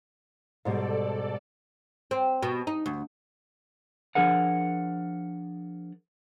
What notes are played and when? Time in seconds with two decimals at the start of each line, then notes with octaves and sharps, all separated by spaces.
0.65 G#2 B2 G3 A4 D5
2.11 C4
2.42 B2
2.67 D#4
2.86 D2
4.15 F3 D4 G#4 A#4 F#5